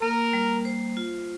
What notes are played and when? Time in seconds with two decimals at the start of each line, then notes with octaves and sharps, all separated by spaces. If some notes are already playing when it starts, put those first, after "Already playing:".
0.02 A#3 A#4
0.33 G3
0.65 C5
0.97 F4